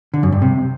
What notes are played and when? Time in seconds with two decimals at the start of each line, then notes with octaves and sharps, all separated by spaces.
0.14 D3
0.23 F#2
0.32 G2
0.42 C3